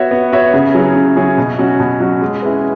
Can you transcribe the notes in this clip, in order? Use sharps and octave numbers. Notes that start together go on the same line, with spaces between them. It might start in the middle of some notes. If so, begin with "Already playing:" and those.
Already playing: B3 F#4 C#5 E5
B3
F#4 C#5 E5
C#3
F#3 C#4 E4 G#4
C#3
F#3 C#4 E4 G#4
B2
F#3 C#4 F#4
B2
F#3 C#4 F#4
G#3
C#4 E4 G#4 B4